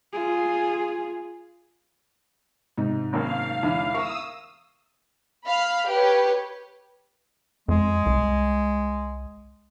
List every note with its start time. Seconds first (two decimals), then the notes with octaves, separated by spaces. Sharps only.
0.13 F4 G#4
2.78 G#2 C3 D#4
3.13 G#1 F#2 A#3 F5
3.63 E2 D3
3.94 E4 A#4 A#5 C#6 D#6 E6
5.45 F5 B5
5.87 G4 B4 C#5
7.68 F2 G#3
8.06 C2